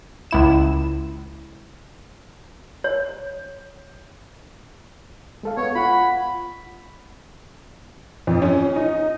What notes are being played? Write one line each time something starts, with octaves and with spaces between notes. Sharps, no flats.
C#2 E4 E7
C#5
G#3 A4 F5
B3 C#5
F4 F#5 B5
F2
C#4
D#4